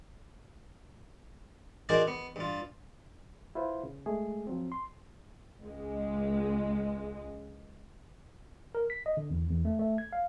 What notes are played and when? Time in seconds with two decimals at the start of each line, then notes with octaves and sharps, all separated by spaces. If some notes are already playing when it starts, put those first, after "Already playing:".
1.89 D#4 F#4 G#4 A#4 C5 D5
2.08 B3
2.36 G2 F4
3.55 E4 F4 B4 C5
3.83 C#3
4.06 G#3 A3 G#4
4.47 F3 F#3 C4
4.72 C6
5.63 C#2 G#3
8.75 A#4
8.90 B6
9.06 D#5
9.17 D3
9.30 E2
9.50 E2
9.65 A3
9.79 A3
9.98 G#6
10.13 F5